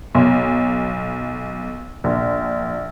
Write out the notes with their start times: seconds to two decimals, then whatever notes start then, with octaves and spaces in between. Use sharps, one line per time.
0.15 B1
2.04 A#1